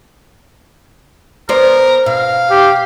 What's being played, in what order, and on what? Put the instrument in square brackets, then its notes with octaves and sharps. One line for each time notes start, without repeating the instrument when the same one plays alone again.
[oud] B3 C5 D5 [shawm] A#4
[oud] B2 [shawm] F5
[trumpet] G4